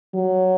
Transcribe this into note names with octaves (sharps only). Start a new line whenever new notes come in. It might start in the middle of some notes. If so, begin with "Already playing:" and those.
F#3